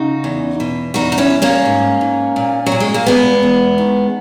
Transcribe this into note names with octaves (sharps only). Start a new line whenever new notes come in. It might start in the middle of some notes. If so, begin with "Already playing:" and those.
Already playing: C#3 D#4 F#4
E2
B2
E2 D#4 F#4
D#4
C#4 E4
E2
A#3 C#4
G#2
G#2
A#2
F#3
A#2
G#3
A#3
E2 G#3 B3
E2
D#3